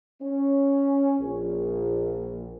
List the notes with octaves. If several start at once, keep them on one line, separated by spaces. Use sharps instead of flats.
C#4
A#1